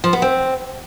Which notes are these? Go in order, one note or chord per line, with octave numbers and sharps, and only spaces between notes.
F3
B3
C4